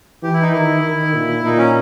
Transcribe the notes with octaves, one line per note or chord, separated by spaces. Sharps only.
E3 G4
E4
D#4
D#3 E4
D#3
A#2
A#2 D#4
C#4